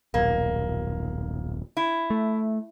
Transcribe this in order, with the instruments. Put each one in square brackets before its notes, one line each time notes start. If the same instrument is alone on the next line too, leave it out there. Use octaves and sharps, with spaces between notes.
[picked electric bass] D#1 B1 [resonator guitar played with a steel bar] A#3
[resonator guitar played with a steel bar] E4
[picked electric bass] A3